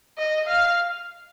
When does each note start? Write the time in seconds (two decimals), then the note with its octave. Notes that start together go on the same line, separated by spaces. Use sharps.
0.18 D#5
0.47 F5